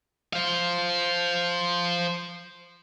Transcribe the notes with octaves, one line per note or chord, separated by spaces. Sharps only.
C5 F5